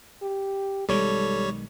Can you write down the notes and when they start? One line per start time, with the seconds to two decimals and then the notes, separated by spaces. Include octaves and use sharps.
0.22 G4
0.89 B1 D#3 G3 G#3 A4 C#5